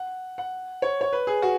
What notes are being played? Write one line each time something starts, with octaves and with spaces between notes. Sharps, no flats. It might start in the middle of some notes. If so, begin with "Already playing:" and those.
Already playing: F#5
F#5
C#5
C#5
B4
G#4
F#4